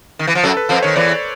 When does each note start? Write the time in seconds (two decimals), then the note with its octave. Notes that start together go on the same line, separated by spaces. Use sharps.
0.19 D#3
0.27 E3
0.35 F3
0.44 F#2 F#3 A4
0.57 B4
0.69 F2 F3 C5
0.83 D#3 C#5
0.96 E2 E3 D5